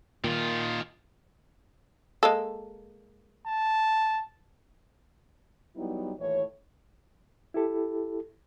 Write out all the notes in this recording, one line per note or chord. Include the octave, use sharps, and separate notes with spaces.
A#2 D#3 F4
G#3 A#3 A4
A5
F#3 G3 B3 D#4 E4
D#2 A2 E3 F4 C#5
E4 G4 A4